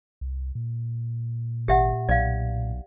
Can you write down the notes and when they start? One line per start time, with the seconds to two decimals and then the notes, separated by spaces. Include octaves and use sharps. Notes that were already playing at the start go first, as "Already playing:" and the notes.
0.21 C2
0.55 A#2
1.68 G#1 G4 E5 F#5
2.09 B1 D5 F5